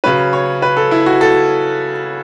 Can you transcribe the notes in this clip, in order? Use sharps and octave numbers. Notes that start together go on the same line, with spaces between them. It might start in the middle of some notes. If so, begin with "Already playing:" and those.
C#3 F#3 C#4 B4
C#5
B4
A4
E4
F#4
A4